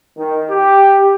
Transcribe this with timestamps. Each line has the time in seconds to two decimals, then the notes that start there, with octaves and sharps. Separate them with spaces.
0.18 D#3
0.51 G4